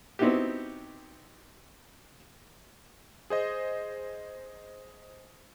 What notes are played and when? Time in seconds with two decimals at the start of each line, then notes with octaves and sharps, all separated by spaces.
0.19 B3 C4 D#4 E4 F#4 G4
3.30 G#4 C5 D#5